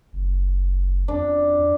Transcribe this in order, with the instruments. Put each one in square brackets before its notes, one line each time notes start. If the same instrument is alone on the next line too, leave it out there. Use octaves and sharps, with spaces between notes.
[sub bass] F#1
[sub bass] F2 [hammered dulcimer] D4